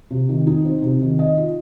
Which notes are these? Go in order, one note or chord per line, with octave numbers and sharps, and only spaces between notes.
C3
D#3
D#4
C4
C3
D#3
D#5
F4